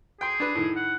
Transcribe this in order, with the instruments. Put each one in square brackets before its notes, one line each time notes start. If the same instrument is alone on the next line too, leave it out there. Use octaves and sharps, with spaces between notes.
[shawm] G#4 [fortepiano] G5 C6
[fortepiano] D4 B4
A2 D#3
[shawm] F#5